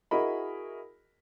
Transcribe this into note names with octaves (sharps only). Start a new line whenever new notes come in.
E4 F#4 G#4 A#4 D#5 B5